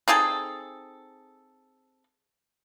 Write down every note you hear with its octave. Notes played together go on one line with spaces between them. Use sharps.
C4 D#4 G#4 A4